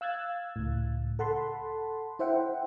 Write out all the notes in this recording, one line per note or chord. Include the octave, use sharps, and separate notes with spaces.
F5 E6 F#6 G#6 A6
C#2 A2
A4 F#5 A5 B5 C6
E4 C5 E5 F#5 G5